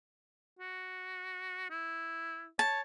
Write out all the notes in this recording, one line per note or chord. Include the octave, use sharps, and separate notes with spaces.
F#4
E4
C#5 A5